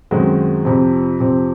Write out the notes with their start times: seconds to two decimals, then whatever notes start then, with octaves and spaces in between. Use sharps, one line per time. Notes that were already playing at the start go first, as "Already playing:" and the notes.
0.11 F#2 D#3 G#3 C4 F#4
0.65 F2 C3 F3 C4
1.20 F2 C3 F3 C4